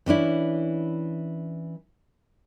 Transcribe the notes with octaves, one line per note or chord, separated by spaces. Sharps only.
E3 C#4 D4 E4